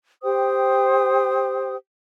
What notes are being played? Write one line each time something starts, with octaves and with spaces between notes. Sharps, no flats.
G4 C5 G5 D#6